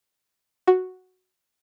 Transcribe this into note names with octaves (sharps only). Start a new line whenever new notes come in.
F#4